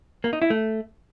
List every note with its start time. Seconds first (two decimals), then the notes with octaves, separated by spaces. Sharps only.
0.24 A#3
0.33 D#4
0.42 E4
0.50 A3